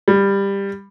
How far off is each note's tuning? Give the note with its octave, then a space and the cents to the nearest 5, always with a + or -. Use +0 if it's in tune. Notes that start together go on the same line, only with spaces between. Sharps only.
G3 +15